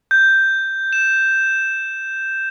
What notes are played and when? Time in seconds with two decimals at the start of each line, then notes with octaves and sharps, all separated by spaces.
0.11 G6
0.93 E7